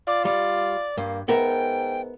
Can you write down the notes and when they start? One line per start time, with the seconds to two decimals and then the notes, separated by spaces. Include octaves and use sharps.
0.07 F4 D5
0.25 G3 D5
0.97 G2 A#3
1.28 G#2 B3 A#4 E5 G5